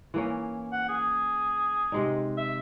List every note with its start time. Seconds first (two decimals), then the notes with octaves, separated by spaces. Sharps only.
0.14 E3 A#3 C#4
0.73 F#5
0.89 G#4
1.92 C3 G#3 D#4
2.37 E5